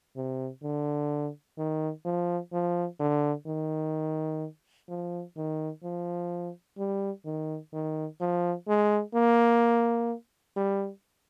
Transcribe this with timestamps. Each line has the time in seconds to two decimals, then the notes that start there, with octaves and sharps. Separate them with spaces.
0.17 C3
0.63 D3
1.58 D#3
2.05 F3
2.53 F3
3.00 D3
3.47 D#3
4.90 F3
5.37 D#3
5.84 F3
6.78 G3
7.26 D#3
7.73 D#3
8.21 F3
8.68 G#3
9.15 A#3
10.57 G3